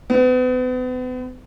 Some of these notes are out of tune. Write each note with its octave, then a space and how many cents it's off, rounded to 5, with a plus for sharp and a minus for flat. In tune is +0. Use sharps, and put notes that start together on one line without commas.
B3 +40